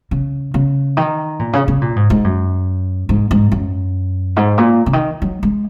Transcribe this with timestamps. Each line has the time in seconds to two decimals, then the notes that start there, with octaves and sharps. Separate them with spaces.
0.11 C#3
0.54 C#3
0.97 D#3
1.39 A#2
1.53 C#3
1.68 C#3
1.81 A#2
1.96 G#2
2.10 G#2
2.24 F#2
3.09 G#2
3.31 G#2
3.52 F#2
4.36 G#2
4.58 A#2
4.86 C#3
4.93 D#3
5.22 F#3
5.43 G#3